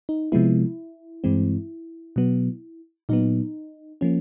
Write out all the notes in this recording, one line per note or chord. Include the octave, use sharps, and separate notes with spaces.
D#4
C3 F3 G#3 B3 E4
G2 E3 G#3 C4
B2 F#3 B3
A#2 F#3 B3 D#4
F3 A#3 C#4